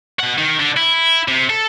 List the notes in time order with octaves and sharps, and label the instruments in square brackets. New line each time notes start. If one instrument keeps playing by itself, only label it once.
[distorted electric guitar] B2 F#5
D#3
D3
E4
C3
A4